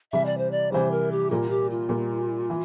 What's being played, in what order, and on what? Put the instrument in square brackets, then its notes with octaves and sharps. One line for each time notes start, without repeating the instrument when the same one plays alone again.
[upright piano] C3 E3 G3 [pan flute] E5
[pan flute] D5
C5
D5
[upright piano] C3 E3 G3 [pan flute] C5
[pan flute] A#4
G4
[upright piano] A#2 G3 A#3 [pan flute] F4
[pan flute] G4
F4
[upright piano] A#2 G3 A#3
E3